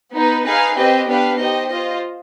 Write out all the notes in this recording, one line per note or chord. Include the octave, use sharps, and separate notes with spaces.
B3 D#4 B4
D#4 G#4 B4 F5 G#5
C4 G4 B4 D#5
B3 D4 G4 B4 F5
D#4 G4 C5 D#5
F4 C5 D#5